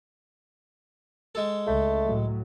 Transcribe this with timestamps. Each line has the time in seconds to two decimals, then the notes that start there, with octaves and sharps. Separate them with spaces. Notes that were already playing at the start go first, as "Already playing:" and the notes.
1.35 G#3 A4
1.67 C#2 A3
2.06 A2 F#3